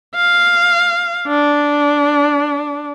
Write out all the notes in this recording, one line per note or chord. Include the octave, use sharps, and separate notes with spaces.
F5
D4